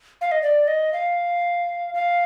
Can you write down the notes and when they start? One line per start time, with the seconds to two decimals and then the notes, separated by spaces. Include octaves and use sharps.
0.21 F5
0.32 D#5
0.42 D5
0.68 D#5
0.93 F5
1.94 F5